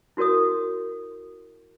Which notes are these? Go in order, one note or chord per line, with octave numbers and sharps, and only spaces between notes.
E4 F#4 A#4 C#5 D#6